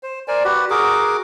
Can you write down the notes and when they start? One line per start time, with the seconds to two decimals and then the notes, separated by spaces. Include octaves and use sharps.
0.03 C5
0.28 A#4 C5 D5 G#5
0.44 F#4 G4 B4
0.70 F#4 G#4 A#4 D6